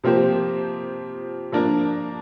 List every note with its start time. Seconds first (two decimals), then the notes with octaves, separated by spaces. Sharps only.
0.04 C3 F3 A#3 G4 C5
1.52 F3 A#3 D4 A#4